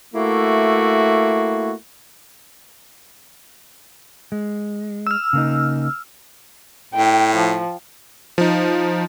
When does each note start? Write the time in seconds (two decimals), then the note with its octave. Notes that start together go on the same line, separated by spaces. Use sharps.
0.15 A3 A#3 E4 F#4
4.32 G#3
5.07 E6 F6
5.33 C#3 A#3 D#4
6.94 A2 G5
7.35 F3
8.38 F3 D#4